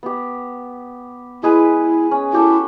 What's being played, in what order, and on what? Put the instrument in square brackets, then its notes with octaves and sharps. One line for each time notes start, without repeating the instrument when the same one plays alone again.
[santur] B3 G4
[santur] G#3 G#4 B4 [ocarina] E4
[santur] C#4
[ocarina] E4 [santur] F#4 G4 A4